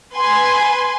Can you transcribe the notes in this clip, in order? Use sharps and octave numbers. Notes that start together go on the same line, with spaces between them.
B4 G#5 C6